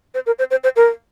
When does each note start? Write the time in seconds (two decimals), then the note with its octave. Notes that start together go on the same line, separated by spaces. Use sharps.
0.14 C5
0.26 A#4
0.39 C5
0.51 C5
0.64 C5
0.76 A#4